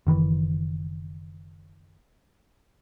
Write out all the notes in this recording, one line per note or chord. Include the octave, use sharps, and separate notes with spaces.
F#1 D#3 E3